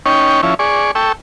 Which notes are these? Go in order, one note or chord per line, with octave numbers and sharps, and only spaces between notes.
C#4 D#4 C#5 G5
F3 C#4 E4
G#4 D5 C#6
A4 G5 C#6 E6